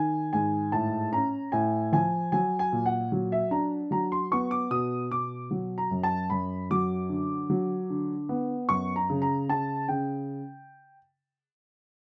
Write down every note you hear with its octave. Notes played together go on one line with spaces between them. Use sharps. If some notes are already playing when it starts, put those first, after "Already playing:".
Already playing: D#3 G#5
G#2 G#5
A2 A5
C#4 A#5
A2 G#5
F3 G#5
F#3 G#5
G#5
A#2
F#5
F#3
E5
D4 A#5
F#3 A#5
C6
B3 C#6
D6
B2 D#6
B2 D6
F#3
A#5
F#2
A5
F#2 B5
F#3 D6
D3
F#3
D3
B3
F#2 C#6
A#5
C#3
A#5
C#3 A5
C#3 G5